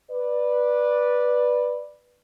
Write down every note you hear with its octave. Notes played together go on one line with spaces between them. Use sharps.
B4 D5